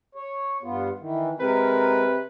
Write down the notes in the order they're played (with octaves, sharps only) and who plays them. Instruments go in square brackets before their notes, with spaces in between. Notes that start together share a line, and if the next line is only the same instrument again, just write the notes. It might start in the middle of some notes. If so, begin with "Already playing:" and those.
[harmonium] C#5
G2 B3 F4
D#3 E3
[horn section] C3 B4 [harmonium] G#3 A#4